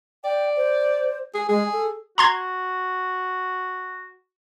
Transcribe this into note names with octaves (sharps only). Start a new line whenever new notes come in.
D5 G5
C5
G#4
G#3 G#4
A4
F#4 A#5 C6 G#6